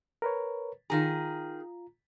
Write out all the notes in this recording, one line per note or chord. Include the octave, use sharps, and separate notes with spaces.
A#4 B4 C#5
D#3 F4 G#4 A#5